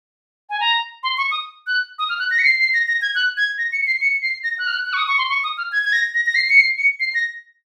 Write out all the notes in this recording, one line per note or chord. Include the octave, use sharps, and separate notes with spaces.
G#5
A#5
C6
C#6
D#6
F#6
D#6
F6
F#6
A#6
C#7
C7
C7
A#6
A#6
G#6
F#6
G#6
A#6
C#7
C7
C#7
C7
A#6
F#6
F6
F#6
F#6
C#6
D#6
C#6
C6
C#6
D#6
F6
G#6
G#6
A#6
A#6
A#6
C7
C#7
C7
C#7
C7
A#6